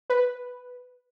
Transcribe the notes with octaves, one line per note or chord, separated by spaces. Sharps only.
B4